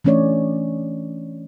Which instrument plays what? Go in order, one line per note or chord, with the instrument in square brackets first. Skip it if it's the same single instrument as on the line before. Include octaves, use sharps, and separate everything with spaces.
[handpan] E3 A3 C#4 D4 C#5 D5